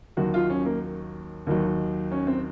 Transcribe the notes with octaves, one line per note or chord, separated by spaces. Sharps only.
D#2 D#3 F#3 F#4
F4
C#4
A#3
D#2 D#3 F#3
C#4
C4